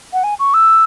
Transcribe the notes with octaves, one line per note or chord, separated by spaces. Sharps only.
F#5
G#5
C#6
E6